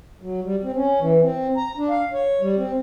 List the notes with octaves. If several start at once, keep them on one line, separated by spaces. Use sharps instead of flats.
F#3
G3
C4
C#4
E3
C4
A#5
D4
F5
C#5
G3
C4